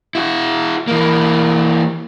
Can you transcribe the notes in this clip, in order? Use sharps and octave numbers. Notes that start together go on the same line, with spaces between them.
E4 F#4
E3 A#3